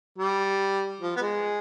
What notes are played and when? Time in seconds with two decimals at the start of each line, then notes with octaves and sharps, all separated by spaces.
0.18 G3
1.00 F3
1.16 B3
1.22 G#3